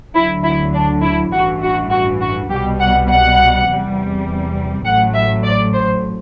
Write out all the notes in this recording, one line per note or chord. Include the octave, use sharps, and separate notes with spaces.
D2 D3 F#3 E4
E4
D4
E4
A1 G2 E3 F#4
F#4
F#4
F#4
C2 B2 G3 G4
F#5
F#5
E2 C3 G3
A1 A2 F#3 F#5
E5
D5
C5